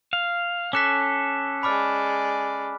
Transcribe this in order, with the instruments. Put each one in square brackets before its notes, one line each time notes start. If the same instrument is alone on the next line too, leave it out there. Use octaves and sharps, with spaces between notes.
[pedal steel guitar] F5
[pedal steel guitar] C#4 A4 [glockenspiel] D6 F#6 B6
[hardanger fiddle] G#3 D5 [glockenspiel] B5 D6 F6